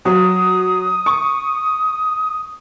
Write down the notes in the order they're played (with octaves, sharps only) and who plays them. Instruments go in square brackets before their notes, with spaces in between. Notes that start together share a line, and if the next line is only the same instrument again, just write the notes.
[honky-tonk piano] F#3 [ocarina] D#6
[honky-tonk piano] C#6